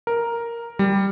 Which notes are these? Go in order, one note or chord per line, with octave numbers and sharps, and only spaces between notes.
A#4
G3